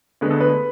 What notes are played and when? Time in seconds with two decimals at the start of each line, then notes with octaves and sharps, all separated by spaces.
0.21 D2 D3 G#3 B3 B4
0.30 A4
0.40 B4